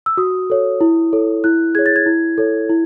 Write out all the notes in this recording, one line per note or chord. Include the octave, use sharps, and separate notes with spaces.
E6
F#4 D#6
A4 C#5
E4
A4 C#5
E4 F#6
G#4 C#5 G#6
A6
G#6
E4
A4 C#5
E4